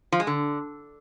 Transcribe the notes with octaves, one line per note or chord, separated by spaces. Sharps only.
F3
G#3
D3